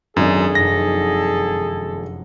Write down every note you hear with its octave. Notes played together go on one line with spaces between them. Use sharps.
G#1 F#2 D4 G#4 A4
F1 F#2 D#4 A#6